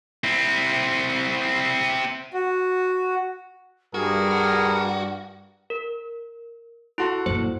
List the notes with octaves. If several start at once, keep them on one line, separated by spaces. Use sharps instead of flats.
C4 E4
F#4
G2 G3 F#4 G#4 A#4
A#4
E4 F#4 A4 C6
F#2 A#2 C5